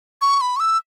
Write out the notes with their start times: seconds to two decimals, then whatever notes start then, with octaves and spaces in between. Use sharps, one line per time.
0.21 C#6
0.41 B5
0.56 C#6
0.60 E6